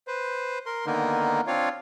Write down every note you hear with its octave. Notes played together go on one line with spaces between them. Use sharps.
B4 C5
A#4 C6
D3 D#3 A#3 B3 D#4 A#4
C4 D4 F4 C#5 F5